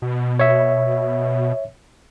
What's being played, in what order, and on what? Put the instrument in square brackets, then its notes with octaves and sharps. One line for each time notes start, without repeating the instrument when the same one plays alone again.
[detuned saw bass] B2
[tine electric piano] C#5 E5